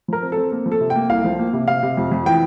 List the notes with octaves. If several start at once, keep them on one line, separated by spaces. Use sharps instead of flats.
F3 A#4
C4
A4
C4
A#3
F3
A4
C3
G5
A#3
C2 F5
F3
A#3
C3
C3 F5
C3
F2
F2
E3 G5